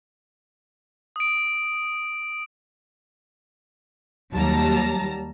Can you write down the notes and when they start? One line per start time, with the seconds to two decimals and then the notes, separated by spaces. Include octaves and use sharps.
1.16 D#6 D7
4.32 D#2 F#3 G3 A5 A#5